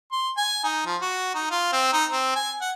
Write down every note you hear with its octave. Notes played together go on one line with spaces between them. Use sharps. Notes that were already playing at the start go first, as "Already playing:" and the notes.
C6
G#5
D#4
F3
F#4
D#4
F4
C4
D#4
C4
G#5
F#5